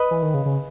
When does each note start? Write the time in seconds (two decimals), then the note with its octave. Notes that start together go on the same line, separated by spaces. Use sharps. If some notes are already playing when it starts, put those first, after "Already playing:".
Already playing: B4 D#5
0.11 E3
0.23 D#3
0.34 C#3
0.46 C#3